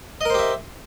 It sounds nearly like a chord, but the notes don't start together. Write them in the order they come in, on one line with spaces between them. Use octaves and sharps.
D#5 A#4 C5 G4 E5